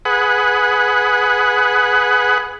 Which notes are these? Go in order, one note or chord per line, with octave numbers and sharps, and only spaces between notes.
G#4 B4 F#5